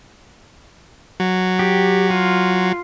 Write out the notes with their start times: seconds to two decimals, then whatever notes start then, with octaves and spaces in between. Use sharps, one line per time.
1.20 F#3
1.59 G4
2.10 F4